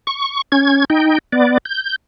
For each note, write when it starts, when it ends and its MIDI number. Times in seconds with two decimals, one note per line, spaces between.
0.07 0.42 85
0.52 0.85 61
0.52 0.85 92
0.90 1.18 63
0.90 1.18 79
1.33 1.58 59
1.33 1.58 74
1.65 1.96 91